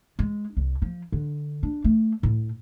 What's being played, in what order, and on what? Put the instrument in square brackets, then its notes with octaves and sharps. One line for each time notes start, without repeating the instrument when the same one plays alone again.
[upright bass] G#3
C2
F3
D3
D4
A3
A2